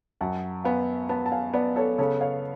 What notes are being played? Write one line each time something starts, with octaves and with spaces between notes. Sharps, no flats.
F#2 F#5 A5
B3 F5 G#5
B3 F#5 A5
A5
F5 G#5
B3 D5 F#5
A4 C#5
C#3 A4 C#5
C#5 F5